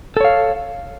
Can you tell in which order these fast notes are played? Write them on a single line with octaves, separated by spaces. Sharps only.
A4 C#5 F5